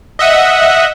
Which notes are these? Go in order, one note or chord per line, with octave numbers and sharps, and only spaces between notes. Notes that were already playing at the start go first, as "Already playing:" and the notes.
D#5 E5 F#5